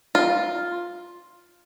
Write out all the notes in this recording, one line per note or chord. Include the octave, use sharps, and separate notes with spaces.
F4